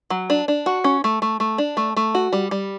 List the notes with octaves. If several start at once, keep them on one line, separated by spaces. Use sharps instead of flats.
F#3
D4
D4
F#4
C#4
A3
A3
A3
D4
A3
A3
F#4
G3
G3